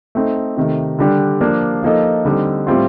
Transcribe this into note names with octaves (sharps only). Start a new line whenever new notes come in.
A3 C4 D#4
C3 D#3 A3
D3 G3 D4 G4
F3 A#3 D4
F3 A#3 D#4 A4 D#5
D3 G3 C4 D#4 A4
A2 G3 C4 F4